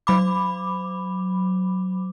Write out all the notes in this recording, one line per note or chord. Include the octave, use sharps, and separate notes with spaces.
F#3 B5 D6